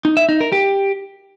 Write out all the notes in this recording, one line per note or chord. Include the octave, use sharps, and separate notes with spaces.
D#4
E5
D#4
A#4
G4